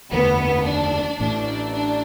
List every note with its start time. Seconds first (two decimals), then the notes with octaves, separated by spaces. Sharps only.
0.11 F#1 E2 D3 A3 B3
0.66 D4
1.19 A1 A2 A3 D4
1.72 D4